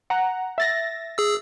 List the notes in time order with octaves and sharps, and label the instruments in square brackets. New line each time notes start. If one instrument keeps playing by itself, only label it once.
[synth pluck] F#5 A#5
E5 A6 A#6
[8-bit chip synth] G#4 E6